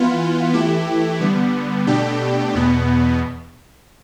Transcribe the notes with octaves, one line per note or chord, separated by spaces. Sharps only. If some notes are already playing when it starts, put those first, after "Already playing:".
Already playing: E3 B3 F4
E3 A3 E4 G4
D3 G3 B3
B2 A3 D4 G4
E2 B2 B3